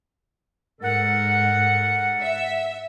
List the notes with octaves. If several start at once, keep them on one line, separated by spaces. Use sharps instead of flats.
G#2 A4 A#4 F#5
E5